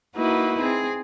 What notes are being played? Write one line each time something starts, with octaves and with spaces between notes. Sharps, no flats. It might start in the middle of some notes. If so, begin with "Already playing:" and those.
A#3 D#4 E4 F#4 B4
C4 G#4